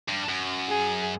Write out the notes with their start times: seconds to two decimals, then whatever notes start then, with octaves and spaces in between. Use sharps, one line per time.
0.09 G2
0.29 F#2
0.68 G#4